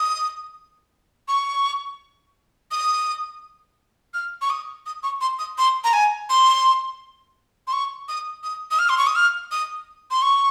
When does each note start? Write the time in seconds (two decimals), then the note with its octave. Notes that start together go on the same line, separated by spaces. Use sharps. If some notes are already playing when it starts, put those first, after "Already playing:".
Already playing: D#6
1.28 C#6
2.71 D#6
4.14 F6
4.41 C#6
4.50 D#6
4.86 D#6
5.03 C#6
5.21 C6
5.39 D#6
5.58 C6
5.84 A#5
5.93 G#5
6.30 C6
7.67 C6
7.73 C#6
8.08 D#6
8.43 D#6
8.71 D#6
8.79 F6
8.89 C6
8.98 C#6
9.07 D#6
9.15 F6
9.51 D#6
10.11 C6
10.22 C#6